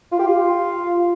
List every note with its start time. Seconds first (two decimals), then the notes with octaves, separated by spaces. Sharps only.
0.12 F4
0.19 G4
0.27 F4